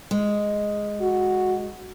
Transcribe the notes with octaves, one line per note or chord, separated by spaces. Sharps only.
G#3
F#4